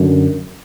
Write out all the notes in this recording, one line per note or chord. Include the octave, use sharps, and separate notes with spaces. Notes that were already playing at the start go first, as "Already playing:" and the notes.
Already playing: F#2 D3